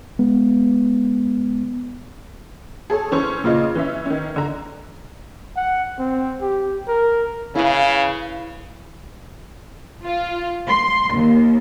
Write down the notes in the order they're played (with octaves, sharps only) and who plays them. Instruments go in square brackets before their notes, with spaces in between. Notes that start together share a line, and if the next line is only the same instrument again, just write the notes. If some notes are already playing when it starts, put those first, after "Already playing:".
[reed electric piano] G#3 B3
[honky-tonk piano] G#4 A4 C#5
E3 C#4 C5 C#6
A#2 C#3 F4 D#5
E3 C#4 E5
D#3 C#4
D3 A#5
[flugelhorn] F#5
C4
G4
A#4
[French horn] C#3 [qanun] E4 B4 [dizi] F5
[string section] F4
C6
D#2